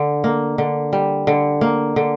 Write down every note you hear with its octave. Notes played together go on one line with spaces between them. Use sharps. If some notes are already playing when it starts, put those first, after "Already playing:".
Already playing: D3
A#3
D3
G3
D3
A#3
D3